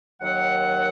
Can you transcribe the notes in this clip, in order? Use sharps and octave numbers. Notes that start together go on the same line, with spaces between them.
D#2 D#3 F#3 F#5